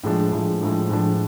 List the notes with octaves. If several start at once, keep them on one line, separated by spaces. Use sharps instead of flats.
A2 F3 G#3 D4
A2 F3 G#3 D4
A2 F3 G#3 D4
A2 F3 G#3 D4